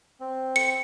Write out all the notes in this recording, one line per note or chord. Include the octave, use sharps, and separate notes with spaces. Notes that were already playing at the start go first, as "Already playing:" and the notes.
C4
C#7